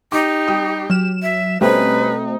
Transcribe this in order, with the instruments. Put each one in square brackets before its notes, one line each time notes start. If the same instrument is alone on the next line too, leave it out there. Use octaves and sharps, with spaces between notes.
[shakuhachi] D#4 [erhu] G4 [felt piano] D6
[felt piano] G3 G5 D#6
[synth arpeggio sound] F#3 E7 [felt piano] F6
[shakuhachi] E5
[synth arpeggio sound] B2 A3 C4 [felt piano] G3 C#4 [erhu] D#4 [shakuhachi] B4